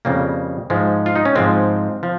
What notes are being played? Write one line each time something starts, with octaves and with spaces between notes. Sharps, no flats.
F2 C#3 G3 A#3
G#2 F3 G#3
F4
D#4
C#4
G#2 F3 G#3 C4
F3